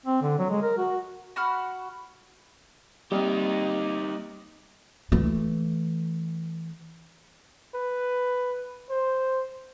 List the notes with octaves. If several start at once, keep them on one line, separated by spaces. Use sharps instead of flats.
C4
D3
F#3
G#3
A#4
F#4
F#4 F#5 B5 F6
G3 A#3 C4 D#4 G4 D#5
E3 A3
B4
C5